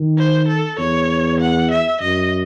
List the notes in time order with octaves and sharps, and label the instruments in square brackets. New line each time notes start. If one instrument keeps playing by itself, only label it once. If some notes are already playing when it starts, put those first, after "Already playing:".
Already playing: [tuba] D#3
[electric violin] C5
A4
[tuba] E2 [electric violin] C#5
[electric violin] F#5
E5
[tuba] F#2 [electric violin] D#5